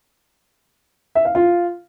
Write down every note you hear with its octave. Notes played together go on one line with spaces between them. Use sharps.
E5
F5
F4